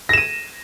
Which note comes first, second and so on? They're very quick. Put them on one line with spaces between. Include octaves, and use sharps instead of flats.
A#6 E7 D#7